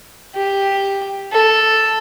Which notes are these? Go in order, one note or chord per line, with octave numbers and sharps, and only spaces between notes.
G4
A4